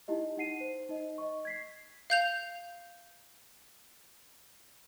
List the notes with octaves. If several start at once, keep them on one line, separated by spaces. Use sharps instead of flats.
D#4 E4 G4 D#5
D#4 F#5 C7 D#7
C5
D#4 D#5
D#5 C#6
G#6 B6 C7
F5 G6 F7